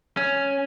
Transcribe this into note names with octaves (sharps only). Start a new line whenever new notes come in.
C#4